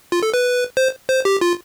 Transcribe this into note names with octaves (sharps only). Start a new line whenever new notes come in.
F4
A4
B4
C5
C5
G4
F4